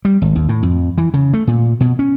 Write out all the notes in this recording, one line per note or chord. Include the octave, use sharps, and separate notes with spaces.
G3
G#1
D#2
A2
F2
E3
C#3
A3
A#2
B2
C#4